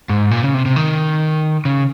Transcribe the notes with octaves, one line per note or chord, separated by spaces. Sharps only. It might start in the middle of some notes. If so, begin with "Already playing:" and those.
G#2
A#2
C#3
C3
C3
D#3
C#3